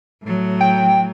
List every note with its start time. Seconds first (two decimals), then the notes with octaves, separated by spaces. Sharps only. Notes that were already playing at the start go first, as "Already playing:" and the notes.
0.23 A2 F#3
0.61 G5